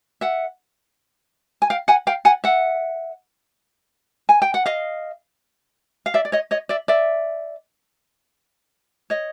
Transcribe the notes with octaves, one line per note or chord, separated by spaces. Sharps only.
E5 F#5
G#5
F5 G5
F#5 G#5
F5 G5
F#5 G#5
E5 F#5
G#5
G5
F#5
D#5 F5
F5
D5 E5
D5
C#5 D#5
C#5 D#5
D5 E5
D5 E5
C#5 D#5